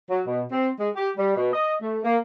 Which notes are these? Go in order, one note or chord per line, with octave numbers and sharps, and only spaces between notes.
F#3
B2
C4
G#3
G4
G3
B2
D#5
A3
A#3